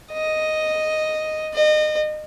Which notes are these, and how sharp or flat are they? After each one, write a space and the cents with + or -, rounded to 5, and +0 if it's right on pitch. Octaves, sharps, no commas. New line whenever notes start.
D#5 +0
D#5 -30